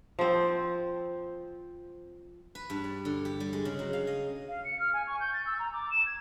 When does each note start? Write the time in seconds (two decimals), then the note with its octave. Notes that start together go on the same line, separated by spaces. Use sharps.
0.19 F3 C4
2.55 B4
2.70 G2
2.84 D5
3.05 D3
3.25 G4
3.40 G3
3.53 G#3
3.65 C#3
3.79 F#3
3.93 F5
4.07 D#5
4.48 F5
4.65 C#7
4.79 F6
4.94 G#5
5.07 C#6
5.20 G6
5.33 A6
5.46 E6
5.59 A#5
5.73 D6
5.91 E7
6.06 G#6